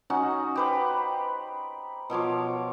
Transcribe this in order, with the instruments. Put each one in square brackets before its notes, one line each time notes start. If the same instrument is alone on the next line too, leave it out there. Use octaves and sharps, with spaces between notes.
[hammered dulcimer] C#4 D#4 F#4
G4 B4 C5
B2 F3 C#5 D6